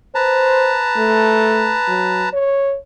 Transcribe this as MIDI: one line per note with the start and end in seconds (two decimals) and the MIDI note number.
0.15 2.29 71
0.15 0.79 72
0.15 2.29 81
0.15 2.29 82
0.98 1.77 57
1.88 2.27 54
2.33 2.76 73